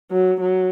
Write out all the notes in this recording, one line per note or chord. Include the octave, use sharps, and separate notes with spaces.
F#3
F#3